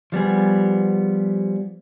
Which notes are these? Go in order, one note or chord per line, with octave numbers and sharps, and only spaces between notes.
F3 G3 B3 G#4